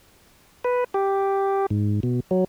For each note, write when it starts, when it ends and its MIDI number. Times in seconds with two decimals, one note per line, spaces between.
0.64 0.84 71
0.94 1.66 67
1.70 2.00 44
2.03 2.20 47
2.31 2.44 54